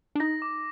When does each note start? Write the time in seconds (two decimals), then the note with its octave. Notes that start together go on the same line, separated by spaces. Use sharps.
0.15 D4
0.20 D#4 A#6
0.42 D6